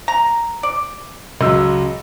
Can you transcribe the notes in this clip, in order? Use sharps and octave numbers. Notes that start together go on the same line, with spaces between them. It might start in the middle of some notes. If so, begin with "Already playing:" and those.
A#5
D5
C#2 F#3 E6